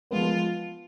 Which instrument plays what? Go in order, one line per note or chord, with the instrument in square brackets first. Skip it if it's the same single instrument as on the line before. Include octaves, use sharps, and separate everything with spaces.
[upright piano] F3 G#3 B3 [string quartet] F4